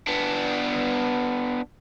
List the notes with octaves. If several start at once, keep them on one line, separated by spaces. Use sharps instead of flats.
B3 D4